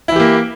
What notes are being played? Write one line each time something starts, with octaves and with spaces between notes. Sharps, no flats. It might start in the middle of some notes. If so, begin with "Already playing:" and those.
E3 A#3 E4 G4